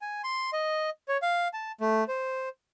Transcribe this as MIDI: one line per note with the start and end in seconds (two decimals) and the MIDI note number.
0.02 0.22 80
0.24 0.50 84
0.53 0.90 75
1.08 1.17 73
1.22 1.48 77
1.53 1.72 81
1.81 2.04 57
2.08 2.49 72